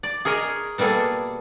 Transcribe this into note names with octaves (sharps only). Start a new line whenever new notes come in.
D5
G#4 A#4 C#5 D#5
B2 G3 A#3 G#4 A4